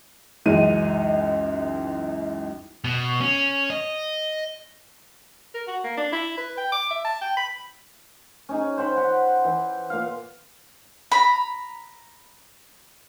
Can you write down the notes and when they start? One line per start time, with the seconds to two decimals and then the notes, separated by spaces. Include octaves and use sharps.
0.46 C#2 F#2 E3 G#3 D#4 D#7
2.84 B2
3.21 C#4
3.70 D#5
5.54 A#4
5.68 F#4
5.84 A#3
5.97 D4
6.12 E4
6.38 B4
6.58 G5
6.72 D6
6.91 E5
7.05 A5
7.21 G5
7.37 B5
8.49 C#4 D#4 G#4
8.78 C5 C#5 G5 B5
8.96 F#5 G5
9.44 E3
9.90 A#2 F5
11.12 A#5 B5